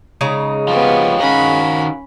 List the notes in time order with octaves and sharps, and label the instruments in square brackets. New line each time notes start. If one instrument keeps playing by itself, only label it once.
[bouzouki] C#3 G#3 D#4
[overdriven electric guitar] F3 G3 [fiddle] B3 C#5 [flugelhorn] F5
[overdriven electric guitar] D#3 F#4 [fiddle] C#4 B5